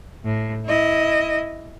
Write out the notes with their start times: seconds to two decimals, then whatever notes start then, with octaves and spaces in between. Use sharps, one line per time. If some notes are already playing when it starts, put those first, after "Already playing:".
0.24 A2
0.66 E4 D#5